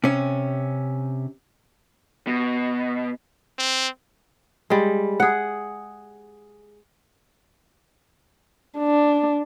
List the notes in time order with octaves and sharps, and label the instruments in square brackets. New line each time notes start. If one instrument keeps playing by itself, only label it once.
[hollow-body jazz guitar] C3 C#4
[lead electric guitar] B2
[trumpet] C4
[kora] G3 G#3
G#4 F#5
[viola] D4